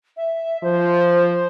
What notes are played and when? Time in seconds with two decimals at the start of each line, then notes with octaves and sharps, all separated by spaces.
0.17 E5
0.63 F3 C5